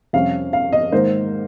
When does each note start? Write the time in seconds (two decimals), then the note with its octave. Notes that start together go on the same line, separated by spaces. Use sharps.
0.13 F2 C3 G3 C#4 F5
0.53 F5
0.73 D#5
0.92 G#2 D#3 A#3 C5